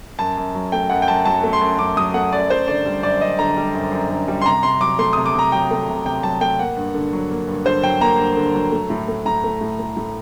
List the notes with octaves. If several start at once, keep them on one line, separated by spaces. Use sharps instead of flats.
F#2 A5
F#2
F#3
A3 G5
F#2 F#5
G5
F#2 A5
F#3 A5
A3
C6
F#2
F#2 D6
F#3 D#6
A3 F#5
F#2 D5
F#2 C5
D3 D5
G3
F#2 D5
F#2 D#5
D3 A#5
G3
F#2
F#2
D3
G3
C6
C3 A#5
C3 C6
F#3 D6
A3 C6
C3 D#6
D6
C3 A#5
F#3 G5
A3
C3
C3 G5
F#3 A5
A3 G5
A#3 F#5
G2
D3
F#3
A#3
G2
D3 C5
F#3 G5
A#3 A#5
G2
D3
F#3
A3
A2
A3
A2 A#5
A3
A2
A3
A2